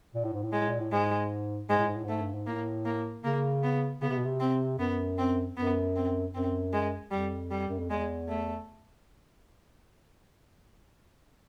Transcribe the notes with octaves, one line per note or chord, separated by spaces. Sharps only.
A#2
A2
G#2
A2
G#3
A#2
A2
G#2 G#3
G#2 G#3
A2
G#2
A2
G#2 A3
G2
G#2
A2 A#3
A#3
C#3 A#3
B3
C#3 B3
C3
B2
C3
C4
F#2 B3
C4
F#2 B3
C4
F#2 C4
G#3
F2 G3
G3
F#2
F2
E2 G#3
A3